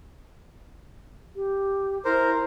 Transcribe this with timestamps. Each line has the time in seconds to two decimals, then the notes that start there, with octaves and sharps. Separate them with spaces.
1.36 G4
2.05 E4 A#4 C5